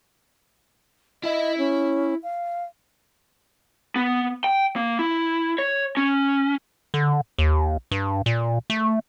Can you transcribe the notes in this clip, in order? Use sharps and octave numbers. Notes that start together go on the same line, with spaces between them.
E4 D#5 E5
C#4
F5
B3
G5
A#3
E4
C#5
C#4
D3
D#2
G2
A#2
A3